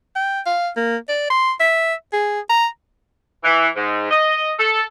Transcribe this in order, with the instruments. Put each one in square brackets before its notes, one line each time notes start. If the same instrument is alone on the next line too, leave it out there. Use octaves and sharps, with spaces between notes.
[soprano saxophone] G5
F5
A#3
D5
C6
E5
G#4
A#5
[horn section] E3
G#2
D#5
A4